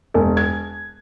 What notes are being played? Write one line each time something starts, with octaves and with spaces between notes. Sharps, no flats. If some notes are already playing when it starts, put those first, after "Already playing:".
E1
G#6